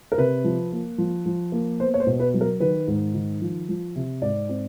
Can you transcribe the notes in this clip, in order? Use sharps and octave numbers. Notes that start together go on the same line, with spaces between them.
A#4
C3 B4
F3
A#3
F3
F3
A#3
B3 C5
C#5
C5
B2
B4
F#3
A#4
D#3 B4
G#2
D#3
F3
F3
C3
G#2 D5
C4